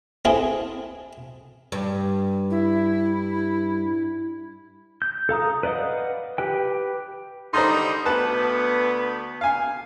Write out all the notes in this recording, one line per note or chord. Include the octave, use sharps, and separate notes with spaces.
C4 E4 G#4 A4
G2
E4
G6
A4 F5 A#5 D#6
B4 D5 D#5 F5 F#5
G4 B4 G5
D3 G3 D#4 C5 A#5 C6
D2 B3 B4 A5
F5 G#5